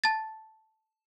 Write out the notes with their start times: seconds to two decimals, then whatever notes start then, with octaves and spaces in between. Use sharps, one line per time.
0.04 A5 A6